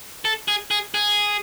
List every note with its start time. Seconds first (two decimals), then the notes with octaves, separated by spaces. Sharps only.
0.25 A4
0.48 G#4
0.71 G#4
0.94 G#4